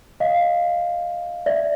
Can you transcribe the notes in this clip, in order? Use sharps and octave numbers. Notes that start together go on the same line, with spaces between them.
D#5 F5
D5 E5